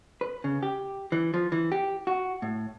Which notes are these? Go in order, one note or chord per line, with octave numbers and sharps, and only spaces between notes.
B4
C#3
G4
E3
F3
E3
G4
F#4
A2